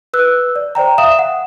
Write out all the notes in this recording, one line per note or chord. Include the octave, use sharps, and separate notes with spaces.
B4 E6 F#6
D5
C5 D5 G5 A#5
E5 F5 D#6 E7
F#5